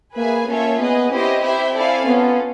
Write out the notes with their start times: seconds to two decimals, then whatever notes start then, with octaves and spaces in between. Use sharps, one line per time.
0.17 A#3 G#4 B4 E5 G#5
0.48 A#3 C#4 F4 A4 C#5 E5
0.79 B3 G#4 B4 D#5
1.11 C4 C#4 E4 G4 C5 D#5
1.43 E4 G4 C5 E5 G5
1.74 E4 A4 D5 F5 G#5
2.06 B3 C#4 F4 A4